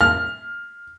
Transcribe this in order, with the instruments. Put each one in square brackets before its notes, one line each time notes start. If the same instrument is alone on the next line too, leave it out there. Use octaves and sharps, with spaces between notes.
[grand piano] F6